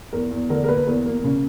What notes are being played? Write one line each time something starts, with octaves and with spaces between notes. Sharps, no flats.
E2 A#4
E2
D3 A#4
A#4
A#3 B4
E2 A#4
A#3
C#3